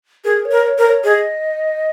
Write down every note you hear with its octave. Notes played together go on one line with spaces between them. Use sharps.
G#4 A#4
C#5
A#4
C#5
A#4 C5
C#5
G#4 D#5